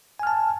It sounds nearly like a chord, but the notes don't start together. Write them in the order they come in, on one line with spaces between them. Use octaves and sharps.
G#5 F6 A5